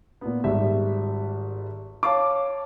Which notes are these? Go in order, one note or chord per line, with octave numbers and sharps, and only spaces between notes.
A#2 B3
G#1 G3 E5
C#5 F5 A5 D6